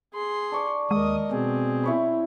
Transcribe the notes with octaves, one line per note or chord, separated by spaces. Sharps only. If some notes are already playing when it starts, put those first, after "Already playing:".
G#4 C6
D4 C#6 D6
D#2 G#3 A#4 D#5 D#6
B2 C4 G#4
E4 C#5 B5